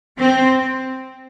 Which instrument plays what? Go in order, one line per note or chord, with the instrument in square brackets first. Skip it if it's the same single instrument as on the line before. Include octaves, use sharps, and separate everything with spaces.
[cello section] C4